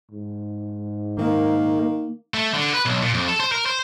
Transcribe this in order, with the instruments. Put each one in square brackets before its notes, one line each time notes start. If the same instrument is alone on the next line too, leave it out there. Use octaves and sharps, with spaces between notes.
[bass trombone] G#2
[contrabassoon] D#3 [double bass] A#3
[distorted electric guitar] A3
D3
B4
B1
A#2
F2
A4
C5
A#4
C5